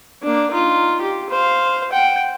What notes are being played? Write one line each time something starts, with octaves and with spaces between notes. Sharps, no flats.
A#3 D4
D#4 F4
G4
C5 F5
F#5 G5